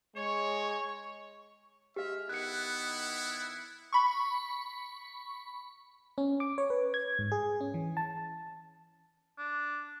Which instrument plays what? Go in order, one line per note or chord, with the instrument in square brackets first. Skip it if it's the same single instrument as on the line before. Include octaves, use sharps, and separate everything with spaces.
[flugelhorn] G#3 [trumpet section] C#5 [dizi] C#6
[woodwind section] G#3 F6 [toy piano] G4 F5 [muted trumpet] E5
[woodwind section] D#3 B3 [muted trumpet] E4 [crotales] F#6 C#7
[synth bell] B5 C#6
[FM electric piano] C#4
D6
C#5
B4
G#6
G#2
G#4
C#4
E3
A5
[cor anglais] D4